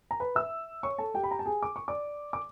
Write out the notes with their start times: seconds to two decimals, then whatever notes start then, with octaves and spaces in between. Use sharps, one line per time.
0.11 A#5
0.20 B4 B5
0.35 E5 E6
0.83 C#5 C#6
0.98 A4 A5
1.14 G4 G5
1.24 B5
1.31 A#5
1.39 A5
1.46 G#4 G#5
1.63 D6
1.76 C#6
1.88 D5 D6
2.33 D6